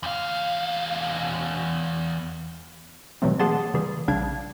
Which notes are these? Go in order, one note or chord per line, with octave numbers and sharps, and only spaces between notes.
E2 F5
B2 E3 F#3 G3 A3 C4
A#3 G#4 F#5 A5 C6 A6
C#3 E3 G3 G#4
A#1 C#3 G3 D4 F5 G#6